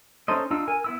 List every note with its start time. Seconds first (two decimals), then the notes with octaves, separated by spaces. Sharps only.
0.28 C#4 D#4 A4 C5 D#5
0.51 D4 D#4 F4 E6
0.68 A#4 G#5
0.84 B3 E4 E6